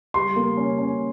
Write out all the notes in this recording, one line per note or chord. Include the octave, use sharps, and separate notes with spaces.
G3 C6
A#3
C#4
C#4